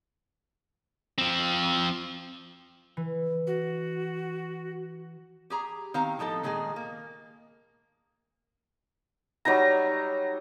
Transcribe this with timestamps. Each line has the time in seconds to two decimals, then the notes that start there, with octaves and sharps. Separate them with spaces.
1.18 F3 C4
2.97 E3
3.47 F#4
5.50 G4 G#4 A#5
5.94 D#3 C4 F5 A#5
6.19 A2 F3 D#4 A4
6.43 A#2 D#3 G#3 D#4 G#4
6.76 A#3
9.45 F#3 G3 D#4 A#5